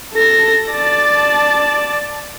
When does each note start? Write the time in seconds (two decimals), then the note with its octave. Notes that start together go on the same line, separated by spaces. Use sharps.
0.14 A4 A#6
0.72 D5 A5